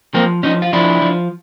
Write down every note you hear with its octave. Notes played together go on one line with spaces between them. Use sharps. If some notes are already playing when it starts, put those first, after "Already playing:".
F3 A#3 C4
F3 C#4 D#4
F4
F3 D4 E4
F3